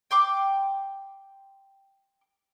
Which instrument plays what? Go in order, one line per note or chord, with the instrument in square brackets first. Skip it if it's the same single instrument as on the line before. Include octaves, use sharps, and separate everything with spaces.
[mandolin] G5 C6 D6